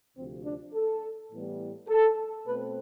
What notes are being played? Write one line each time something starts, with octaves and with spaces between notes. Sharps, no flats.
D2 C3 F3 C4
D4
A4
A2 E3 G3 B3
A4
B2 A3 C4 B4